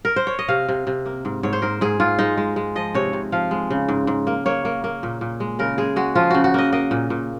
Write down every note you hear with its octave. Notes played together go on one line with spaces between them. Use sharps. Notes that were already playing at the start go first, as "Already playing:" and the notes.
A#4
C5
C#5
D#5
C3 F5
C3
C3
A#3
G#2
G#2 C#5
C5
G#2 A#4
G#2 G#4
G#2 F4
G#3 D#4
G#3
G#3
F3 D#5
C3 C#5
C3
F3 F5
G#3
C#3
G#2
G#2
A#3
A#3 C#5
A#3
A#3
A#2
A#2
G#3
C#3 A#4
G#3 G#4
G#3 F#4
F3 F4
C#3 F#4
F#4
A#3 D#5
A#3 D#5
A#2
A#2